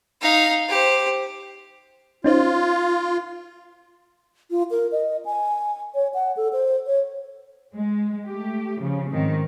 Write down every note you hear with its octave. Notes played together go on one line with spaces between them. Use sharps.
D#4 F5
G4 C5
C#4 D#4 F4 C5
F4
A#4
D#5
G#5
C#5
F#5
A4
C5
C#5
G#3
A3 G4
C#3 F3
G#2 D#3 C4